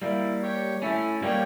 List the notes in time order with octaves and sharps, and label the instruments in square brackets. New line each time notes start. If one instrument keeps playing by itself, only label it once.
[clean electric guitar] G3 A#3 [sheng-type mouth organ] E4
[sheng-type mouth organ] G4 C#5 G5
[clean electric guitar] A3 C#4 [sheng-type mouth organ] E4
[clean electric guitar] G3 A#3 [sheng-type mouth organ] G4 C#5 G5